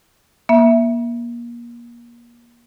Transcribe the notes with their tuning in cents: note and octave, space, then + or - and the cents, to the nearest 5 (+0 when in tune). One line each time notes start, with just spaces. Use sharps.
A#3 +30 E5 +0